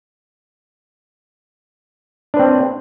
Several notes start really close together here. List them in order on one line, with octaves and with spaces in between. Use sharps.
D4 B4 C4